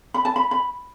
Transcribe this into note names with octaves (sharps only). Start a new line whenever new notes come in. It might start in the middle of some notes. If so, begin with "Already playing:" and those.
B5
A5
B5
B5